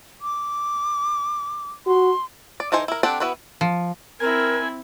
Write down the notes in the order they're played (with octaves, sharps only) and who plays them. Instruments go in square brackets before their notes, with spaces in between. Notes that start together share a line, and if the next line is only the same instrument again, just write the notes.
[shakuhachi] D6
[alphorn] F#4 [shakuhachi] C6
[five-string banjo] D5
E3 D#4 A4 C5 G#5
E4 A#4
C4 D4 G4 A4 F#5
B3 E4 F#4 B4
[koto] F3
[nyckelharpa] C4 E4 [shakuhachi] A#4 [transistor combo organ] G#5